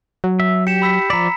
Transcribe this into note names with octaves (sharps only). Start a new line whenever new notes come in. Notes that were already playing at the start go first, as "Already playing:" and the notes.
F#3
E5
G4 C#7 E7
B5 E6 B6
F3 D5 A#5 B5 B6